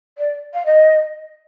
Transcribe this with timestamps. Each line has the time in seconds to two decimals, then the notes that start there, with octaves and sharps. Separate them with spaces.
0.18 D5
0.53 F5
0.65 D#5